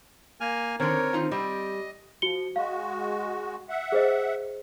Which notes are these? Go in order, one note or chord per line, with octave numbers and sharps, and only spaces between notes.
A#3 G#5 F6
D3 D#3 C4 A#4 C#5
D#3 D#4 F4
G3 C4 D#5
F3 F#4 C#7 G7
G#3 F#4 F5
E5 F#5
G#4 C5 D#5